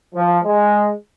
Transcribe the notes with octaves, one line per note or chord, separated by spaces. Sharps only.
F3
G#3